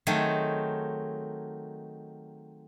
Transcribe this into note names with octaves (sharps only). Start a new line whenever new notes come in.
D#3 F#3 A3 C4 G#4